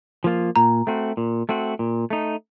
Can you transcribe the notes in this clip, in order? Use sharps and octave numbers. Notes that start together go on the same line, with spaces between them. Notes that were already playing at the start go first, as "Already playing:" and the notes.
F3 A#3 F4
A#2 A#5
A3 C4 F#4
A#2
A3 C4 F#4
A#2
A3 D#4